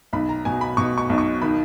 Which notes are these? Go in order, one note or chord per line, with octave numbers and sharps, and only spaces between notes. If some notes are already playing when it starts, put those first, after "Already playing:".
B1 B5
A#5
B2 G#5
B5
B2 C#6
C#6
B1
C#6
D#3 B5